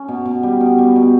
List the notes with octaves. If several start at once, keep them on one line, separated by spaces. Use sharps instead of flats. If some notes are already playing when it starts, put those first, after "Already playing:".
Already playing: C#4
B2
B2
G3
B2
G3
B2